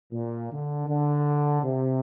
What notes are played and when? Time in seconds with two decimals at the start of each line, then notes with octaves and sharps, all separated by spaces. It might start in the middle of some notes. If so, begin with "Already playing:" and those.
0.13 A#2
0.52 D3
0.88 D3
1.64 C3